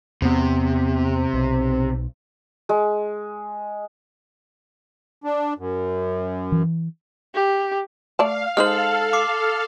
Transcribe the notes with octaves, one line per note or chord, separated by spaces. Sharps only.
E2 C3 B3
B1
G#3
D4
F#2
E3
G4
A3 D5 F5 A5
G#3 D#4 A4 C5 F5 F6 F#7
D6 C7